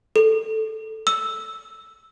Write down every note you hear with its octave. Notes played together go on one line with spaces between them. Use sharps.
A4
E6